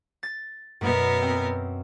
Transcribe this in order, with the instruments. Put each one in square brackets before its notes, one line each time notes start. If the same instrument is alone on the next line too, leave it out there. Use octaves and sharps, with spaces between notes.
[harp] A6
[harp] F#2 [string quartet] B2 B3 A#4
[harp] C4